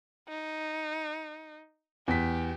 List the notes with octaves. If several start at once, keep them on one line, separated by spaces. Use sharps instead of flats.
D#4
E2 G4 B6